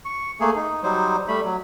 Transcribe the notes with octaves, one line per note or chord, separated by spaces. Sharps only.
C#6
A3 A#3 G#4
D#4
F#3 G3 D#4 C5
G3 A3 B5
F#3